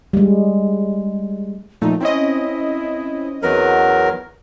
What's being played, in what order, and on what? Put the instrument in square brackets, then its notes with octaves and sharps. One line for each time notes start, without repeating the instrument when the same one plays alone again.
[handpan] G3 G#3
[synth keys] A#2 F3 A3 [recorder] D#4
[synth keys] C4 C#4 D#5 [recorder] E4
[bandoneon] E2 F#3 A#4 [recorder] B4